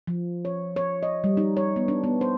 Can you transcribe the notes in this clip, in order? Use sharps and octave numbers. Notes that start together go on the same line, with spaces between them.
F3
C#5
C#5
D#5
G3
D#4
C#5
B3
D4
B3
C5